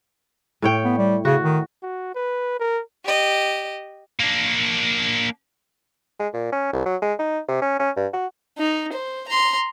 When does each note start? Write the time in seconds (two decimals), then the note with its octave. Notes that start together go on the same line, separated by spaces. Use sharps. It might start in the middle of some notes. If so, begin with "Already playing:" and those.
0.62 A2 C#5 G5
0.84 B3
0.98 G3
1.25 C#3 F#4
1.43 D#3
1.83 F#4
2.15 B4
2.60 A#4
3.04 G4 D#5
4.20 A#3 D4
6.19 G#3
6.34 A#2
6.53 C#4
6.73 C2
6.86 F#3
7.02 G#3
7.19 D#4
7.48 C3
7.62 C#4
7.80 C#4
7.96 G2
8.14 F#4
8.58 D#4
8.92 C5
9.28 A#5 C6